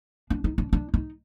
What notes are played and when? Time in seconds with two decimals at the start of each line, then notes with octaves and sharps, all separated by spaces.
0.30 D4
0.44 D#4
0.58 D4
0.73 D4
0.94 D#4